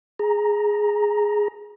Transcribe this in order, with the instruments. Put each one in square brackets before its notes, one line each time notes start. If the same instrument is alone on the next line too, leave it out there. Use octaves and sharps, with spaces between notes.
[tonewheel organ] G#4 A#5